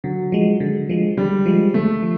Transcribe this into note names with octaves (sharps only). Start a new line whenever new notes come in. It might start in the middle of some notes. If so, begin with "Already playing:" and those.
D3 F#3
F3 G#3
D3
F3 G#3
D3 G3
F3 G#3
D3 A3
F3